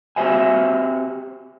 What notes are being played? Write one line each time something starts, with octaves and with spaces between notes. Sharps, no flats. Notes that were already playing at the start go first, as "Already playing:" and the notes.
C4 F#4 G4 C5 E5 G#5